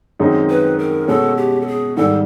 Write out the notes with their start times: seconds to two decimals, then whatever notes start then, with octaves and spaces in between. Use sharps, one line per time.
0.19 F#2 D#3 G#3 C4 D#4
0.49 B4
0.79 A#4
1.08 B2 G#3 C#4 A4
1.37 G4
1.61 A4
1.67 G#4
1.96 G#2 D#3 G3 A4